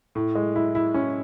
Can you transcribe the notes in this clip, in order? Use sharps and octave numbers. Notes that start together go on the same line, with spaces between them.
A2
G#3
E4
E4
C#4